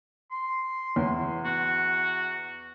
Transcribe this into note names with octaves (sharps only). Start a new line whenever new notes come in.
C6
E2
F#4